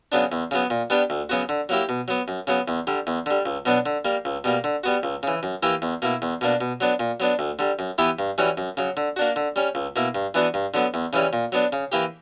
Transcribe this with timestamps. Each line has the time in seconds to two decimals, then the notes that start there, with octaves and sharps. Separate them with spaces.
0.12 C#3 F#3 B3 D4
0.32 E2
0.51 C#3 F#3 B3
0.70 A#2
0.90 G3 B3 D4 G4
1.10 D2
1.29 C#3 F#3 B3 F#4
1.49 D3
1.69 F#3 A#3 E4 G4
1.89 B2
2.08 F#3 B3
2.28 F#2
2.47 C#3 F#3 B3
2.68 E2
2.87 D3 G3
3.07 E2
3.26 D3 G3
3.46 C#2
3.66 B2 F#3 B3 D4
3.86 D3
4.05 G3 A#3
4.25 C#2
4.44 B2 G3 A#3
4.64 D3
4.84 G3 B3 F#4
5.03 C#2
5.23 C#3 E3
5.43 F#2
5.63 E3 A#3 E4 G4
5.82 E2
6.02 B2 A#3 E4
6.22 E2
6.41 B2 A#3 D4
6.61 B2
6.81 F#3 B3 D4
7.00 A#2
7.20 F#3 B3 D4
7.39 D2
7.59 D3 G3
7.79 F#2
7.98 E3 B3 E4 G4
8.19 G2
8.38 E3 G3 C#4 F#4
8.57 F#2
8.77 C#3 F#3
8.97 D3
9.16 A#3 D4 F#4
9.36 D3
9.56 G3 C#4
9.75 C#2
9.96 B2 A#3 E4
10.15 G2
10.34 E3 B3 D4 F#4
10.54 G2
10.74 D3 F#3 B3
10.94 E2
11.13 C#3 E3 G3 C#4
11.33 A#2
11.52 F#3 B3 D4
11.73 C#3
11.92 E3 A#3 E4 G4